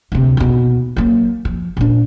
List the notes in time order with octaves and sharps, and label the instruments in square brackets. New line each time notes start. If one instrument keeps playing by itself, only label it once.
[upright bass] D2 C3
D#2 B2
F#3 A#3
F3
A#2 D4